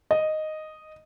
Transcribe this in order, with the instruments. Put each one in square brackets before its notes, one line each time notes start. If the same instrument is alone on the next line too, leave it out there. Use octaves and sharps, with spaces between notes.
[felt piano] D#5